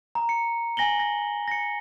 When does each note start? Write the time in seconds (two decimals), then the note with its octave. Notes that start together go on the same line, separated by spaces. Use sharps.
0.15 A#5
0.29 C#7
0.77 G#5 A#6 F#7 G7
0.99 A#6
1.48 A#6 C#7